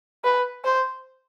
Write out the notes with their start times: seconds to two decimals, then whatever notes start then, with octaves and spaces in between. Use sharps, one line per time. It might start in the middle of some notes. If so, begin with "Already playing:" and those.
0.24 B4
0.65 C5